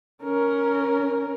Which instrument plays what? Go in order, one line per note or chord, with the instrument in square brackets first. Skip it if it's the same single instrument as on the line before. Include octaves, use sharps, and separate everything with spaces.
[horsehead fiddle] C#4 A#4